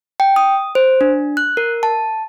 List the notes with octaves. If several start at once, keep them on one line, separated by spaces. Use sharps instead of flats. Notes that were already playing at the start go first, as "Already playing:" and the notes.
G5
D#6
C5
D4
F#6
A#4
A5